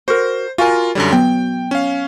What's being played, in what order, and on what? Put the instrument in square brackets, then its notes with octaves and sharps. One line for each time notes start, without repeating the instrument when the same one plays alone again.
[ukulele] F#4 A#4 [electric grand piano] C5
[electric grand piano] F4 A#4 [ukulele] F#4 F5 G#5
[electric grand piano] F#2 D3 G3 [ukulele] C#5
[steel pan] F#3 B3 [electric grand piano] G5
[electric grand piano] C#4 F5